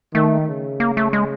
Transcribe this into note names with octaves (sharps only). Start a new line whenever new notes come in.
D#3 A3
C#3
A#3
A3
G#3